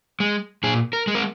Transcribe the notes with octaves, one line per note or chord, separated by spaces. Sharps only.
G#3
A#2 G#4
A#4
G#3
A#4